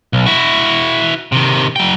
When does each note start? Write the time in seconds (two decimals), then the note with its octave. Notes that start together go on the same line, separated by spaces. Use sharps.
0.13 B1
0.26 E4 F#4
1.32 C3 D#3
1.76 F#3 G5